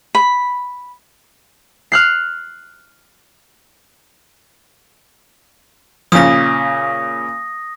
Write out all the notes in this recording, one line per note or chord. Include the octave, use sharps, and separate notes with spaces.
B5
F6 F#6 C7
A#2 C#3 F3 D#6 A#6